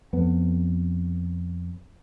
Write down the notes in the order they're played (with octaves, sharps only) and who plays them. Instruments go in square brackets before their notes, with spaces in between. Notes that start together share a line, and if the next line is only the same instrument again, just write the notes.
[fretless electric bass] F2 B3